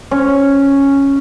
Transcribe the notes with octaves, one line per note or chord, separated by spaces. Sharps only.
C#4